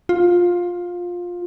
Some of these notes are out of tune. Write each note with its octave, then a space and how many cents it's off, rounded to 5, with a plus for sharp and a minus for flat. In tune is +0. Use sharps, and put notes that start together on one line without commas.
F4 +15